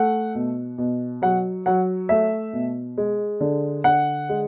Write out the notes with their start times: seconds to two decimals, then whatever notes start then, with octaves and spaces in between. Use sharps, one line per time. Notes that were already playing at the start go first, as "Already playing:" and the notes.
Already playing: A3 F#5
0.35 B2
0.78 B2
1.22 F#3 F#5
1.66 F#3 F#5
2.09 A3 E5
2.53 B2
2.98 G#3
3.40 D3
3.84 D3 F#5
4.29 G#3